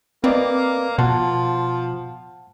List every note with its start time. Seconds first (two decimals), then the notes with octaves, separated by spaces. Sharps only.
0.24 A#3 C4 B4 D5 D#5
0.98 B2 F3 F#5 A5